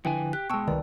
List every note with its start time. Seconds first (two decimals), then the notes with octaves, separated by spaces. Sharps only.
0.05 D3 F3 E4 B4 G5 G#5
0.33 G4 F#6
0.50 B2 G#3 G5 A5 C#6 E6
0.68 C2 D#3 B4 D5